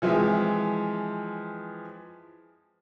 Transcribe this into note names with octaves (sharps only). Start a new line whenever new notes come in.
E3 F3 G#3 C4 E5